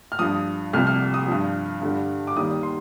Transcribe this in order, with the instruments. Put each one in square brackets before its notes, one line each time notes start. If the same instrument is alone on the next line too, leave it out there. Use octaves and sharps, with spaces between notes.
[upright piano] F6
G2 F3 D#6
C2 C3 F3 F6
F6
D#6
G2 F3
G2 D3 G3
D6
D#2 D#3 G3 D#6
C6